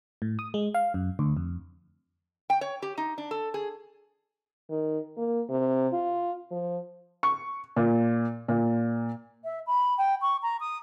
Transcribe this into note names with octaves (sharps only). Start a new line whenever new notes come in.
A2
D#6
G#3
F5
F#2
D2
F2
G5
C#5
G4
D#4
D4
A4
G#4
D#3
A#3
C3
F4
F3
C#6
A#2
A#2
E5
B5
G5
C#6
A#5
D#6